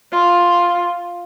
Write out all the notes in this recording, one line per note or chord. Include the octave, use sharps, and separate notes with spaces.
F4